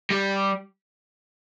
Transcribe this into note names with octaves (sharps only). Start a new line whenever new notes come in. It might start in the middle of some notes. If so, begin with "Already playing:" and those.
G3